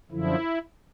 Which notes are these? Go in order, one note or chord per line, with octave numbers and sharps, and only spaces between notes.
F#2 D3 F3 E4